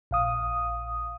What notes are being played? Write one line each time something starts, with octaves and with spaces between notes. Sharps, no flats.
A#1 F5 D#6